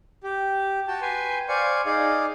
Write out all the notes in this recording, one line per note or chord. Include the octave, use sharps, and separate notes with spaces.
G4
F#4 G5 A5
B4 G5 G#5 C6
C5 D5 F5 G#5 C#6
D#4 G#4 D5 F5